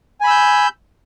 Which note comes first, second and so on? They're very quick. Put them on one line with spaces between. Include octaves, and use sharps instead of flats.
G#5 B5 E6 G6